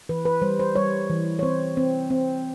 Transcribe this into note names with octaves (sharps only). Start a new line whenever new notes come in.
E3 B4
B4
G3 C5
C5
G3 C#5
E3
C#5
C4 C5
C4
C4